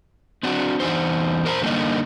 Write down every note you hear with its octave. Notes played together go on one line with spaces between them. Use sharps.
C4 D4 F#4
E2 G2 D#4 C5
A#4 C5 A5 A#5
D3 G3 A#3 C4 D#4 D#5